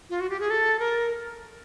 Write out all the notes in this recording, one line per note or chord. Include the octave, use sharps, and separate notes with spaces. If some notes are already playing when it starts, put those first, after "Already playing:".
F4
F#4
G4
G#4
A4
A#4